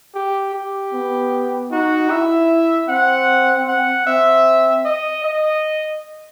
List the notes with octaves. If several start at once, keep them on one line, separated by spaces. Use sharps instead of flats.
G4
G4
B3
D#4 F#4
E4 E5
C4 F#5
F#5
C4 E5
D#5
D#5